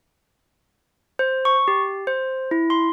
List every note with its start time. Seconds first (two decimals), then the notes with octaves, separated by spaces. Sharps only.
1.19 C5
1.45 C#6
1.68 G4
2.07 C5
2.51 E4
2.70 C6